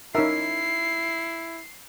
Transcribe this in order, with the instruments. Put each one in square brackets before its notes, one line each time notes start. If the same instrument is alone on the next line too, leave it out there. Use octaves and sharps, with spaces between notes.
[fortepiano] C#4 A#4 [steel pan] D#4 E5 [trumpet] E4 [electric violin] C7